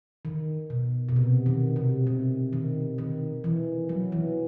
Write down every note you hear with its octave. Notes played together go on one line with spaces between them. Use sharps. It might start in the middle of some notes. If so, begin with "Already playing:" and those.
D#3
B2
B2
C3
D#3
C3
C3
D#3
D#3
E3
F#3
E3